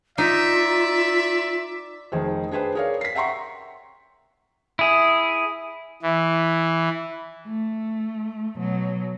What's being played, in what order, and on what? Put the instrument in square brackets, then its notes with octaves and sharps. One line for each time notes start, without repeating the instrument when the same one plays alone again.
[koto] D#4 [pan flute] F4 [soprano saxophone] D5 [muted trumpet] E5
[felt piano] F1 D#3 G#4 C5
D4 G#4 B4 C5 G5
G#4 A#4 C#5 D5 F5
B6 C7
E5 F#5 G5 A#5 C6 C#6
[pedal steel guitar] E4 G#4
[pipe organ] E3
[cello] A3
B2 F#3